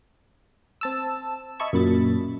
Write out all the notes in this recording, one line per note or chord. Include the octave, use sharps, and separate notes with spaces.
C4 A5 E6
D#5 E5 A5 B5 C#6 G#6
F#2 A#2 B5 A6